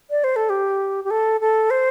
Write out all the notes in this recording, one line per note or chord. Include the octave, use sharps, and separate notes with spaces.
D5
C5
A4
G4
G4
A4
A4
C5